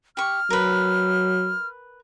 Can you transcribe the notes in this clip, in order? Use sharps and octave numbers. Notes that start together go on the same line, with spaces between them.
G4 C#6 F6
F#3 A#4 B4